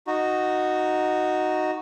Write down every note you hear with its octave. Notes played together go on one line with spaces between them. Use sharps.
D#4 F#4